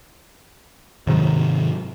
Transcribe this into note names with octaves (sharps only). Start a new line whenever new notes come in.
G#2 C3 D#3 F#3